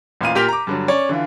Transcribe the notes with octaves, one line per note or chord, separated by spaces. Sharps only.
A1 A#2 F5 D#7
A#2 G4 A#4 G6 B6 F7
A#5 D6
G2 D3 F#3
C#4 C#5 D5
D3 E3 F4